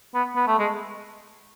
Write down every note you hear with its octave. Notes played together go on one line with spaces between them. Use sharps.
B3
B3
A3
G#3